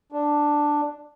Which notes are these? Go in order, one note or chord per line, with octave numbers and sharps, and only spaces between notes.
D4